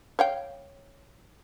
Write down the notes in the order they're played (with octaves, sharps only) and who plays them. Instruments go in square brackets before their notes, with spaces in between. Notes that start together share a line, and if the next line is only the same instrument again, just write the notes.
[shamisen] C#5 F5 G5